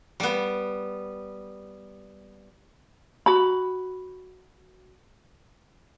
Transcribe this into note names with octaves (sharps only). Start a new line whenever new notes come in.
G3 B3
F#4 B5